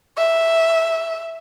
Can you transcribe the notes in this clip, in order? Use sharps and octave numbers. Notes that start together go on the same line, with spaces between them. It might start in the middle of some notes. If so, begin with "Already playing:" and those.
E5